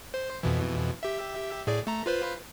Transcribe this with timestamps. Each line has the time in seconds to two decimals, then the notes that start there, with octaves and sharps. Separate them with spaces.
0.14 C5
0.43 F2 B2 E3
1.03 G4 E5
1.67 A2 G#4 D5
1.87 A3 A#5
2.06 F4 B4 C5